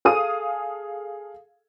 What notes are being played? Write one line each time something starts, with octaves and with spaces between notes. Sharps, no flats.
G#4 A4 F5 D#6 D#7